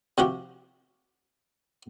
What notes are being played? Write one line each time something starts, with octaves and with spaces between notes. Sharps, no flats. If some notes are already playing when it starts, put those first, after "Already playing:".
C3 F3 F#4 G4